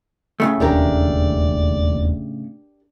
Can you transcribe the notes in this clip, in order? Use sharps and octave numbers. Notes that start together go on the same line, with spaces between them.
A2 C#3 A3
E1 D#2 D4 G4 A#4 D5